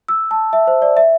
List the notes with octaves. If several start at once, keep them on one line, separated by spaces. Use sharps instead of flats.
E6
A5
E5
C5
D5
E5